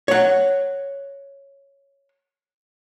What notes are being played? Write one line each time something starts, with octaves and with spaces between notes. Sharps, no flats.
C#5 F#5